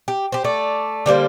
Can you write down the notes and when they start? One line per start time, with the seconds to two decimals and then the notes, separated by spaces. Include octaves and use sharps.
0.08 G4
0.32 G4 C5
0.44 A3 D5
1.06 D3 G3 A#3 C5